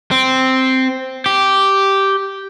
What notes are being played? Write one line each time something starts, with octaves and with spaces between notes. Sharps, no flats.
C4
G4